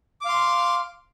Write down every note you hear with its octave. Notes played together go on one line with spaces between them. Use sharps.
F5 C6 D6